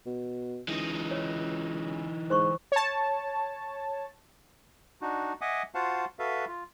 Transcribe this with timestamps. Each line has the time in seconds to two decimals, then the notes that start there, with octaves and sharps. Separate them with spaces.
0.06 B2
0.68 C#2 E3 D#4
1.11 C#5
2.30 G#2 C5 C6 C#6
2.72 C#5 A5
5.02 D4 D#4 F#4
5.41 D#5 E5 F#5 G#5 D6 D#6
5.75 F4 F#4 C5 F5 F#5 A5
6.19 F#4 A4 B4 E5 F5
6.48 F4